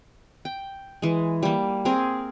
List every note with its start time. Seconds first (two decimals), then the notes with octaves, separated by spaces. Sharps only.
0.45 G5
1.02 E3 G#3
1.43 G3 A#3
1.85 C4 G#4 A#4